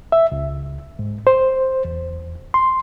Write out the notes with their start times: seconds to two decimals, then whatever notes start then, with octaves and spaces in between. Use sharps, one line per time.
0.12 E5
0.32 C#2
0.99 G#2
1.27 C5
1.85 E2
2.54 C6